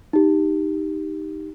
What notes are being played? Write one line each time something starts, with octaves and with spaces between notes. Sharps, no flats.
D#4 G4